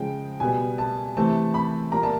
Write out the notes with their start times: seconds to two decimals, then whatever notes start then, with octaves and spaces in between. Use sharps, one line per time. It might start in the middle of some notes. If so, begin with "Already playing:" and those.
Already playing: C#3 F3 G#3 G5
0.40 B2 G3 B3 G#5
0.78 A5
1.17 C3 E3 A3 C4 A5
1.54 B5
1.92 A#2 G3 A#3 A#5
2.03 A5